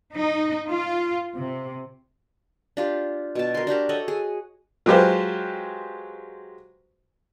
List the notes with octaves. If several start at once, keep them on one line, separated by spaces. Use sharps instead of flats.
D#4
F4
C3
D4 F4 G4
B2 A5
A#4 C6
D4 F#4 G4 A#4
A4 C#5 D#5 F#5
G#4
F#3 G#3 F4 G4 B4 C5